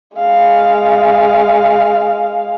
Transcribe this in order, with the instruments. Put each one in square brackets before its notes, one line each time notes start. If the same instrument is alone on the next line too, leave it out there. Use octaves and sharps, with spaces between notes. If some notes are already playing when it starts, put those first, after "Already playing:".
[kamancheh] G#3 F5